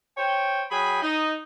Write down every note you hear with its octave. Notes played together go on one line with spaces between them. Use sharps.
C5 C#5 G5
F#3 G#4 G5 B5
D#4